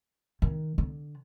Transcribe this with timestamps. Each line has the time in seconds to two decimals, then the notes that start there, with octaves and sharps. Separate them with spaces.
0.42 D#3
0.78 D3